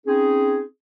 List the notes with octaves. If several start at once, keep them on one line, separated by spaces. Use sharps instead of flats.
C4 C#4 D#4 G#4